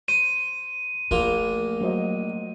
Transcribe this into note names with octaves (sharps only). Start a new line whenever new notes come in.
C5 D#7
A#1 F3 A3 A#3 F4
F#3 C5 D#5